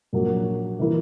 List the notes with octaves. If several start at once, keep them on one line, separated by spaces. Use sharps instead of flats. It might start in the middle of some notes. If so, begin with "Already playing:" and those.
A#1 A#2 F#3 A#3
E3 A#3 E4 A#4